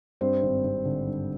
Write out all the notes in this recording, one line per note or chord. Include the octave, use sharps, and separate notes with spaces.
G2 C4 C5
G#1
G#1
D3
G2